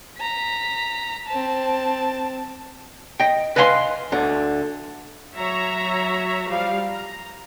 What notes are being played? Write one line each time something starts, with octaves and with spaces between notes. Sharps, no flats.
A#5 B6
C4 A5
D#5 G5
B4 D#5 F5 G#5 B5 C6
D2 D3
F#3 C#5 E5 A#5
F3 G3 F5
A#5